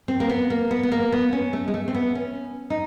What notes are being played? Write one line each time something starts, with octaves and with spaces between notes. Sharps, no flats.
C4
A#3
B3
A#3
B3
B3
A#3
B3
C#4
A3
G#3
A3
C4
B3
C#4
D#4